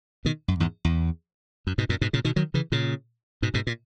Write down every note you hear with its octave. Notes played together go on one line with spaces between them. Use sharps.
B2 D#3
F#2
E2 G#2
E2
F#2
G#2 B2
F#2 A#2
G#2 B2
A#2 C#3
B2 D#3
D#3 F#3
C#3 E3
A#2 C#3
G#2 B2
G#2 B2
A#2